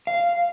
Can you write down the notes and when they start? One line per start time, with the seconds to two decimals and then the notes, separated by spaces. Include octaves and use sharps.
0.07 F5